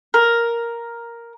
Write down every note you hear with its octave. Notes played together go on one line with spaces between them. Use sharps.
A#4